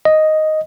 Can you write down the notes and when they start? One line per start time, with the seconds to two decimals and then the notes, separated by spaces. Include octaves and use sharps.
0.05 D#5